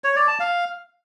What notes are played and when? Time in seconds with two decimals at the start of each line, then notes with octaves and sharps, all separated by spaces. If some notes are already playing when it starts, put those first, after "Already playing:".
0.04 C#5
0.16 D5
0.28 A5
0.40 F5